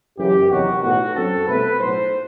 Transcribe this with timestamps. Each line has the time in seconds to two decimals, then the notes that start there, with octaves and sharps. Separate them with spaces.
0.18 F#1 F#2 E3 G4
0.50 E2 C3 D#3 F#3 F#4
0.82 B1 A2 F#3 B3 F#4
1.14 F#2 F#3 C4 A4
1.46 C2 B2 A3 C4 B4
1.79 B1 A2 F#3 C5